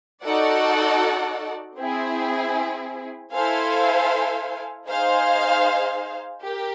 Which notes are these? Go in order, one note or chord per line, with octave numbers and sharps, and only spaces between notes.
D#4 F#4 A4 D5 F#5
C4 E4 G#4
E4 A4 C5 F5 G#5
D#4 G#4 C5 F5
G4 A#4